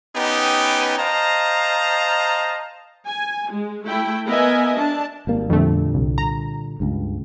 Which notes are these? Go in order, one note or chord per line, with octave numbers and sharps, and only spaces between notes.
B3 C#4 D#4 G4 B4
C5 D#5 F5 A5 A#5
G#5
G#3
A3 E4 G5
B3 A#4 D#5 E5 G#5
D4 A5
G#1 G3 A#3
F2 A#2 D3 G3 A3
C2
A#5
C#2 G2